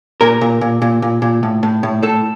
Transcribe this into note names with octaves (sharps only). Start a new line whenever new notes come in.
A#2 A#4
A#2
A#2
A#2
A#2
A#2
A2
A2
A2
A2 A4